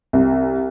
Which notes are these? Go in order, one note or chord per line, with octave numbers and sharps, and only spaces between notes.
C2